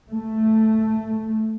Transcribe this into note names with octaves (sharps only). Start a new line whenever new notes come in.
A3